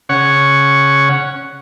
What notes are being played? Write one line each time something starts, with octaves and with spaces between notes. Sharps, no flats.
C#3 C#5 F#5